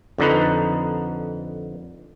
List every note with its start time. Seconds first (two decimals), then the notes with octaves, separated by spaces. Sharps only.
0.18 F2 D3 D#4 B4